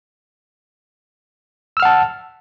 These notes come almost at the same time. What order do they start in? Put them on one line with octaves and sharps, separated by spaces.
E6 F6 F#5 A5